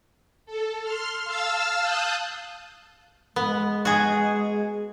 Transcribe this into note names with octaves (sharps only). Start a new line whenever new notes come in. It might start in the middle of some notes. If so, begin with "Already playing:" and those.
A4
C6 F6
F5 A5 E6 F6
A5 D#6 F#6 G6
G#3 B3
F#4 G#4